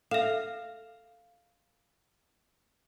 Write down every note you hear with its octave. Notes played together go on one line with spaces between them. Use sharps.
A4 E5 F5